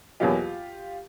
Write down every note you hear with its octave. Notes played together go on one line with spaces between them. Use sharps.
E2 B2 F#3 A#3 F4 G4